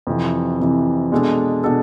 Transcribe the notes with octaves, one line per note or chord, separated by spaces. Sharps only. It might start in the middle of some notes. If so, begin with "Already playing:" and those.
F2 C3 E3
F2 C3 E3
B2 G#3 D4 A4
B2 G#3 D4 A4